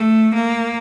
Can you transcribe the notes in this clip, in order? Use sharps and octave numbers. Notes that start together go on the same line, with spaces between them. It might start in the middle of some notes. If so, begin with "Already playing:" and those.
Already playing: A3
A#3